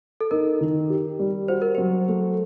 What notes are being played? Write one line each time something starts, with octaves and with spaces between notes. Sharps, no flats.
A4
D#4 A#4
D#3
G4
G3
F#4 C5
A#4
F#3 C5
A3